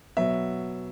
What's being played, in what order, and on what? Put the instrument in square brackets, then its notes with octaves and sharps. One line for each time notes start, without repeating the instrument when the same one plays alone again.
[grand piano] B2 F#3 B3 E5